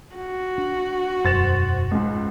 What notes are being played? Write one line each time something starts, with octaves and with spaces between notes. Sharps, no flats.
F#4
D4
E1 F#2 C5 A6 E7
C#2 G#2